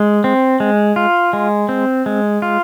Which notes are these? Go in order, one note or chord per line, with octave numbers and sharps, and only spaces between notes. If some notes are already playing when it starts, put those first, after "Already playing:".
Already playing: G#3
C4
G#3
F4
G#3
C4
G#3
F4